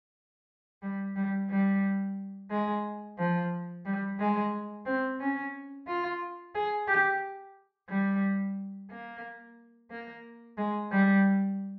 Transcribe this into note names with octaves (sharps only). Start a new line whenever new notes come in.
G3
G3
G3
G#3
F3
G3
G#3
C4
C#4
F4
G#4
G4
G3
A#3
A#3
G#3
G3